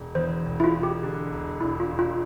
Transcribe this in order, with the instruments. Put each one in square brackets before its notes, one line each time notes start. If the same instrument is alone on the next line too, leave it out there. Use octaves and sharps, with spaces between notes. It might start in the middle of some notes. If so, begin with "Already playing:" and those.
Already playing: [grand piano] E1
[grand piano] E2 [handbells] C5
[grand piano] E1
[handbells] E4
F4
[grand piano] E1
[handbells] G4
[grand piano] D3
E1
[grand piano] E1 [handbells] E4
[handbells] F4
[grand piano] E1
[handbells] F4